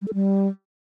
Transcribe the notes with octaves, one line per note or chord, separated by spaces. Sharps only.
G3
A4
G3